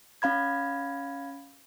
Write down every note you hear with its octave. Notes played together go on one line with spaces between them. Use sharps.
C#4 F5 B5 G#6